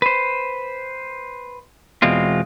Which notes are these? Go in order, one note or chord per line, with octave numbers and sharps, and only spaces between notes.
B4 C5
E2 B2 G#3 C4 F4